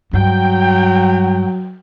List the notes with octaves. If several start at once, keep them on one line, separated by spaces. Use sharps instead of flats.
G2 F#3 G5